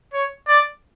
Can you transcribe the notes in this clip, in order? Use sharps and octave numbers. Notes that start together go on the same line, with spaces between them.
C#5
D5